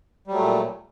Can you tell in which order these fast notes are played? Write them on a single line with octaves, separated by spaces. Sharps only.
G3 F#3 A3 A#2